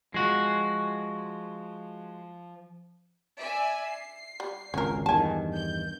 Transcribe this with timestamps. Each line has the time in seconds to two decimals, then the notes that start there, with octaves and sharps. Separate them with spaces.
0.14 F3 G#3 F#4
3.38 D5 E5 G#5
3.87 C7
4.40 G3
4.74 G#1 C#2 C#4 A#4
5.06 E2 G2 D#3 G#5 A5
5.54 G6